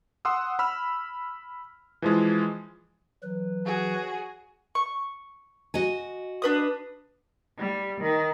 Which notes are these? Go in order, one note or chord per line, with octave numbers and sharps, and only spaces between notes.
F#5 C6 D#6 E6
B5 E6 F6
E3 F3 G#3
E3 F#3 B4
F#4 G#4
C#6
F#4 D#5 G#5
D4 B4 D#6
G3
D#3